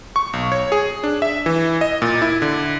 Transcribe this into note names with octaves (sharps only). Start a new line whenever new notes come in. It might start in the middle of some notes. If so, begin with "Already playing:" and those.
C#6
B1
C#5
G#4
D4
E5
E3
D#5
A#2
E4
D3